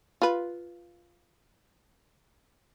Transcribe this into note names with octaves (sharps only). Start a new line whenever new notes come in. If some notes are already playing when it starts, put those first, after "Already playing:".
F4 B4